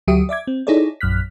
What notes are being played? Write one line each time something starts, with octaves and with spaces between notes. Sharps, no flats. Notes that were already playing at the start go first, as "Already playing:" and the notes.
D2 F#3 F#4 G4 E5 D#6
D5 E5 D6 G#6
C4
D#4 E4 G#4 A4 C#5 D5
A#1 F#2 F6 F#6 B6